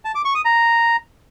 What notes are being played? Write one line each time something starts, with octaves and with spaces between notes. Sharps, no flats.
A5
D6
C#6
D#6
A#5